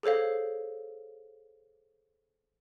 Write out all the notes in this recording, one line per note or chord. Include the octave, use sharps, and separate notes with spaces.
G#4 A4 C5 C#5 F5